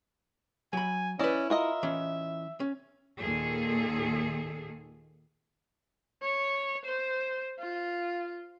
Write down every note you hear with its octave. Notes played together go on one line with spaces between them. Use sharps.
F#3 G#5 B5
C#4 E4 B4 D5 D#5
F4 A#4 D#5 E5
E3 C#4
C#4
D#2 A#2 D#3 A#3 G#4 A4
C#5
C5
F4